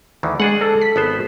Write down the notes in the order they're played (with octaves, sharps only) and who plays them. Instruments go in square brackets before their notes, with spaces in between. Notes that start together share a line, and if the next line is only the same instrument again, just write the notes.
[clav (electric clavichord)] D2 D#3 E3
[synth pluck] G#3 [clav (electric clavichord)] D4 G#4 F#5
[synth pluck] A4
B6
[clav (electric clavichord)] G#1 B3 C5